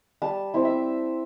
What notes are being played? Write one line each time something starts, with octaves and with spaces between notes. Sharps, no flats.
G3 A5
C4 E4
E5